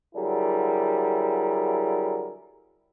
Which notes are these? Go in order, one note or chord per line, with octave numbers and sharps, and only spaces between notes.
D3 F#3 G3 E4 G#4 A#4